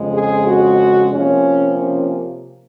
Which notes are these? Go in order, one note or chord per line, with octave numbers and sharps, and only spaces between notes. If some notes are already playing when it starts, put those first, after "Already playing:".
Already playing: F2 C#3 G#3
G#4
F#4
C3 F3 A#3 C#4
C#4